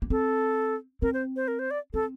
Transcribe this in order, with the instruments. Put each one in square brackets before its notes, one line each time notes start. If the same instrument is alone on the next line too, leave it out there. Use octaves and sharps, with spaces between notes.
[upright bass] A#3
[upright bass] C4 [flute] A4
[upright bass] C4 [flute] A#4
[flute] C5
C5
A#4
C5
D5
[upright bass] C4 [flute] A4